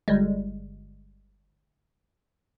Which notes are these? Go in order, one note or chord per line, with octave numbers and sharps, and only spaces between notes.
G1 G3 G#3